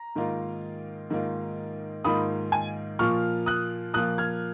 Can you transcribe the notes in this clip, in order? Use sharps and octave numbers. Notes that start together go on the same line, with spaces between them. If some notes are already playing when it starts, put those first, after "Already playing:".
Already playing: A#5
G#2 D#3 A#3 F4
G#2 D#3 A#3 F4
G#2 D#3 A#3 F4 B5 D#6
G#5
A#2 F3 A#3 F4 C#6 F6
D#6 F#6
A#2 F3 A#3 F4 D#6 F#6
F6 G#6